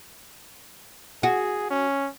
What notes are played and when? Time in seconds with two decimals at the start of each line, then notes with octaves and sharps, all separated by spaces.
1.23 F#4 G#4
1.70 C#4